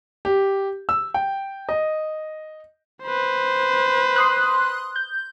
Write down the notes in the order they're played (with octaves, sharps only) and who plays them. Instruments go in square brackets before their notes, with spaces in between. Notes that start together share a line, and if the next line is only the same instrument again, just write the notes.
[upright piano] G4
E6
G5
D#5
[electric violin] B4 C5
[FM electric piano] C6 D#6 F#6
G6